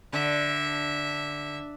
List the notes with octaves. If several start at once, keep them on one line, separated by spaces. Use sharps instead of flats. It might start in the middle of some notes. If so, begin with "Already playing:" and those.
D3 E5